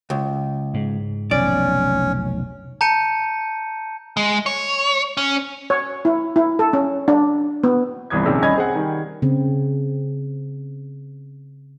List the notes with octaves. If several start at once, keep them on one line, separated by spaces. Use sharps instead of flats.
C#2
G#2
F1 B1 C#4 D5
A5 A#5 G6 C#7 D#7
G#3
C#5
C#4
C#5
E4
E4
A4
C#4
D4
B3
G1 C2 E3 D#6 G#6
A#1 C3 D#3 C#4 G#4 E6
C2 C#4 D#5 B5 G#6
C4 G#4 F#5
D#3 G3
C#3 C4